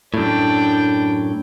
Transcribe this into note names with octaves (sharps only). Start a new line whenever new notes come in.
F#2 A2 D4 G5